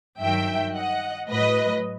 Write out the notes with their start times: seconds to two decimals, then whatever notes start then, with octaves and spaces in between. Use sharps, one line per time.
0.20 G2 D#3 F#3 E5 G5
0.75 D#5 F#5
1.30 A2 F#3 B4 D#5